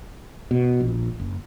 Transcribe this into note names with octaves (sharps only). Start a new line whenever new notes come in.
B2
A#1
F#1